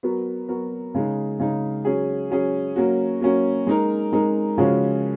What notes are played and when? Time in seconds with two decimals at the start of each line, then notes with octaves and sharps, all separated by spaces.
0.03 F#3 B3 F#4 A#4
0.49 F#3 B3 F#4 A#4
0.94 C#3 G#3 D#4
1.39 C#3 G#3 D#4
1.85 F#3 C#4 G#4
2.30 F#3 C#4 G#4
2.76 F#3 A#3 C#4 F#4
3.21 F#3 A#3 C#4 F#4
3.67 G#3 D#4 A#4
4.13 G#3 D#4 A#4
4.58 C#3 F3 G#3 C#4 F#4